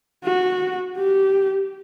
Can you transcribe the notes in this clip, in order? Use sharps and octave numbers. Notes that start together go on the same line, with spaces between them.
F#4
G4